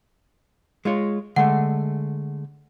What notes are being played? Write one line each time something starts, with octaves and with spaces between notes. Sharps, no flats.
G#3 F4 C#5
D3 G#3 A3 F#5